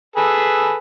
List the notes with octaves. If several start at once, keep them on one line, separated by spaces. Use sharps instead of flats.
G#4 A4 B4